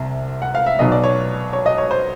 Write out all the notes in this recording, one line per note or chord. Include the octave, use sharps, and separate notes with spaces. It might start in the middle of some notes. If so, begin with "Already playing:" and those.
Already playing: C2 C3
F#5
F5
E5
B1 B2 F#3 D#5
D5
C#5
C#5
D#5
C#5
C5